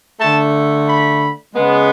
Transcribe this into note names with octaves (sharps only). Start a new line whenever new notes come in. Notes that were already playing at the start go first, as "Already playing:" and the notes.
D3 A3 A5
B5
C#3 G#3 B3